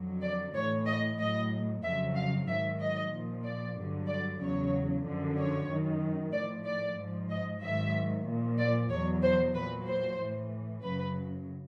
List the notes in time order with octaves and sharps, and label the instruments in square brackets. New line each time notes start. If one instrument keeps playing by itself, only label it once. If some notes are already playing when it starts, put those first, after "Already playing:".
Already playing: [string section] F2 D3 F#3
D5
A2 E3 C#5
D#5
A2 F#3 D#5
F2 C#3 F#3 E5
F5
G#2 D#3 F#3 E5
D#5
A#2 F3
D5
G2 D3 F#3
D5
E2 C#3 F#3 C#5
F#2 D3 F3
C#5
F#2 D#3 F#3
A2 F3 D5
D5
G#2 F3
D#5
G#2 D#3 F#3 E5
A#2 F3
D5
E2 B2 F#3 C#5
C5
A#2 F#3 B4
C5
A2 E3
F#2 C#3 F#3 B4